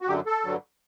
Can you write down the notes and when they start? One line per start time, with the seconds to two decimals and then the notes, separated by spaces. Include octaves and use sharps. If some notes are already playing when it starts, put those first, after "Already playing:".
0.01 F#4
0.08 F#2 D3 F#3 G4
0.26 A4
0.44 G2 D3 F#3